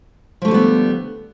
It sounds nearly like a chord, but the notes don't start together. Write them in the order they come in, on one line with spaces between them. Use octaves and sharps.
F3 A3 D3 G3 B3